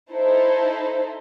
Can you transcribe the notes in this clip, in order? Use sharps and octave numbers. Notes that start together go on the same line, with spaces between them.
D#4 E4 A4 C5